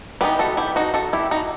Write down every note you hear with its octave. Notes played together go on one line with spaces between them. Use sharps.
E3 G3 B3 D#4 G4 B4
F#4 A4
E4 G4
D#4 F#4
F#4 A4
E4 G4
D#4 F#4